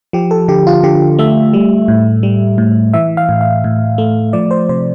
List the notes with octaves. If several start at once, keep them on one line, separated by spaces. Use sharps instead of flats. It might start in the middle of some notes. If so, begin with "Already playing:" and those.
F3 G4
A4
D3 G4
F4
D3 G4
A3 E5
G3
A2
G3
A2
E3 E5
F5
A2
F5
A2
A3
F3 D5
C5
C3 C5